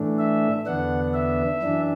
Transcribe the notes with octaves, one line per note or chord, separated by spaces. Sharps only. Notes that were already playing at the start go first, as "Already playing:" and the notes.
Already playing: A2 E3 A3 D4
E5
E2 D3 B3 D4 F#5
E5
F#2 E3 D4